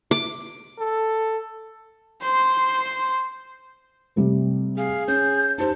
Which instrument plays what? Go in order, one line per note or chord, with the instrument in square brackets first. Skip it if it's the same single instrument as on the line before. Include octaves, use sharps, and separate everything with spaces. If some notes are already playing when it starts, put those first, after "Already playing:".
[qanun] D6
[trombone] A4
[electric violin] C5 C6
[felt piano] C3 G3 A3
[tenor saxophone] G#4 [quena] F5
[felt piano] C#4 [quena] G6
[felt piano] D#4 G4 C5 [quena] A5